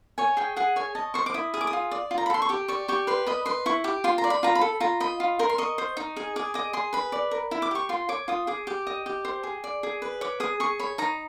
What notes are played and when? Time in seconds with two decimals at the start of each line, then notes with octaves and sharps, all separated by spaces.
0.18 C#5 G#5
0.37 G#4 G5
0.56 G#4 F#5
0.76 C#5 G#5
0.95 D#5 A5
1.14 C5 C#6
1.26 D6
1.34 E4 D#6
1.54 G#4 D#6
1.61 D6
1.67 D#6
1.73 F4
1.91 D5
2.11 F4
2.18 A#5
2.26 B5
2.30 A4 C6
2.42 C#6
2.49 G4 D6
2.68 D5 C#6
2.88 G4 C#6
3.07 B4 C6
3.26 D#5 B5
3.46 B4 C6
3.66 E4 C#6
3.84 G4 D6
4.04 F4 C6
4.18 A#5
4.24 D5
4.30 B5
4.43 F4 A#5
4.55 B5
4.61 A4
4.80 F4 A#5
5.00 D#5 B5
5.20 F4
5.39 A#4 C6
5.49 C6
5.58 D#5 C#6
5.78 C5
5.97 D#4
6.17 G#4
6.36 G#4 D6
6.54 D#5 D6
6.73 G#4 C6
6.93 B4 B5
7.12 D5
7.31 A#4
7.51 E4
7.62 D6
7.71 G4 C#6
7.89 F4 C6
8.09 C#5 D6
8.28 F4 D#6
8.47 G#4 D6
8.67 G4 D6
8.87 D#5
9.06 G4
9.25 C5
9.43 G#4
9.64 D5
9.83 G#4
10.02 B4
10.21 C#5 D6
10.40 G#4 D#6
10.60 G#4 C#6
10.79 C#5 B5
10.98 D#4 A#5